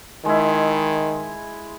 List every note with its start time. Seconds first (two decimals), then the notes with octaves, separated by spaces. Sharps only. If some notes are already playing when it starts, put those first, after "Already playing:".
0.25 D#3 G#3 E4